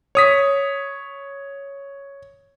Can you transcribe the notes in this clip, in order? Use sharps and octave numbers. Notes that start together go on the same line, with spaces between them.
C#5 D#6 B6